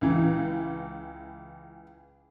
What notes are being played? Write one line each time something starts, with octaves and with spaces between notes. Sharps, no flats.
C#2 E3